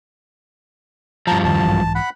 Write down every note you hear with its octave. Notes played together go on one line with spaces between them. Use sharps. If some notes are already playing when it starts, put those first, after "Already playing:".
G2 F3 A5 A#5
E2 D#3 A5
B1 G#2 E3
F#5 B5